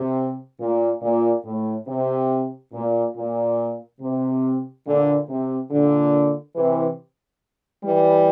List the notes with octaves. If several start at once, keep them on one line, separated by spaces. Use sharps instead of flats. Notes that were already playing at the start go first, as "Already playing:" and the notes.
Already playing: C3
A#2
A#2
A2
C3
A#2
A#2
C3
A#2 D3
C3
A#2 D3
C3 E3
E3 G3